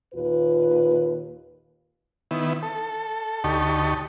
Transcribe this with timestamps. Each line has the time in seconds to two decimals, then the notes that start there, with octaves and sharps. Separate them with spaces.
0.14 D#2 A#2 F4 B4
2.31 D#3 B3 E4
2.63 A4
3.44 D2 D#4 G4 A5 C#6